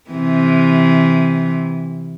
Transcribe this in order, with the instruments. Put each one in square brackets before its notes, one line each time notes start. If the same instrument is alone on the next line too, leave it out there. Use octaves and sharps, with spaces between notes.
[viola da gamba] C3 E3